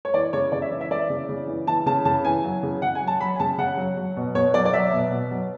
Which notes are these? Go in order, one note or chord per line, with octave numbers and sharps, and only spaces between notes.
C#5
E3 D5
C#3 C#5
C#3 D5
E5
E3
E5
E3 D5
C#3
C#3
E3
E3 A5
C#3 A5
C#3 A5
E3 G#5
F#3
C#3
C#3 F#5
G#5
F#3
A5
F#3 B5
G#5
C#3 A5
C#3 F#5
F#3
F#3
B2
B2 C#5
F#3 D5
D5
F#3 E5
B2
B2
F#3